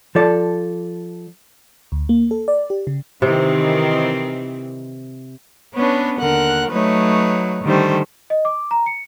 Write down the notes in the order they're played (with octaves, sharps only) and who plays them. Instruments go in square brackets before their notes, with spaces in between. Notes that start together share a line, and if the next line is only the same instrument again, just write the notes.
[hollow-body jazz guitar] F3 A4 D5
[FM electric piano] D2
A#3
A4
D5
G4
C#3
[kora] C3 [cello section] D#3 E3 C4
[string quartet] B3 C#4 D4 B4 C#5
D#2 D3 A#4 F#5 F#6
F#3 A3 D#4 B4 C#5
D3 D#3 G3 A3 C5
[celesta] D#5
D6
A#5
C#7